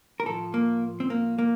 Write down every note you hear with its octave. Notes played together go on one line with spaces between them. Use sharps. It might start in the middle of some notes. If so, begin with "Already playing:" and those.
A#4
A2 F3 A4
A#3
C4
A#3
A#3